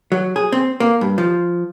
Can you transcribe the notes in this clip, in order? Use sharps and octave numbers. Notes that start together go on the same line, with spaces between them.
F#3
G#4
C4
A#3
G2
F3